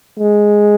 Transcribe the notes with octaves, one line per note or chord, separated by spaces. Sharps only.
G#3